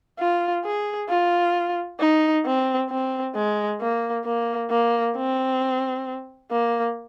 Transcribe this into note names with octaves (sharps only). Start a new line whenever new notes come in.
F4
G#4
F4
D#4
C4
C4
G#3
A#3
A#3
A#3
C4
A#3